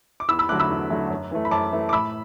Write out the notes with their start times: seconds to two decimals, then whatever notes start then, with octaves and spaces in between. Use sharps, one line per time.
0.20 D6
0.28 E2 B5 E6
0.39 B5 E6
0.49 D3 F#3 A3 D6 F#6
0.59 B5 E6
0.70 E2
0.90 D3 F#3 A3
1.10 F#2
1.31 E3 A3
1.45 B5
1.51 F#2 A5 D6
1.72 E3 A3
1.89 D6
1.93 A2 B5 E6